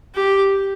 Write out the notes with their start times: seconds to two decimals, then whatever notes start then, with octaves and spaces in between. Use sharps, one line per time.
0.15 G4